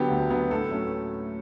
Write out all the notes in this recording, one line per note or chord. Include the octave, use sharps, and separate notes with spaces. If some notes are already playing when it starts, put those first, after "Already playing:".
Already playing: D3 F#3 B3 G4
D2
D3 F#3 B3
A2 A4
F#3 A3 C#4